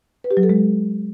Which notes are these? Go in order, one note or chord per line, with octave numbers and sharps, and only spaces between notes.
B4
G4
F#3
A4
G#3